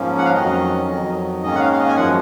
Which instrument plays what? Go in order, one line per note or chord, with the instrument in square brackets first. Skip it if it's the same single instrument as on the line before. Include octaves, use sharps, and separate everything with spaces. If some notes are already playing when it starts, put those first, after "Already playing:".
Already playing: [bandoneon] G#2 F3 A#3 C#4
F#5
F5
F2 D#3 F#3 C#4 D#5
F2 D#3 F#3
G#2 D#3 A#3 C#4 D#5
F#5
F5
F5
D#5
G#5
F#2 F3 G#3 F#5